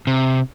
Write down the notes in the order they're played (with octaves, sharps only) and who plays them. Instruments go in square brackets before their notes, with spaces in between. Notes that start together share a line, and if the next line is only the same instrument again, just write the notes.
[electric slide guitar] C3